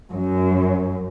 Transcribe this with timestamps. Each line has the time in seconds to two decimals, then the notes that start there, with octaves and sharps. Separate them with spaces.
0.12 F#2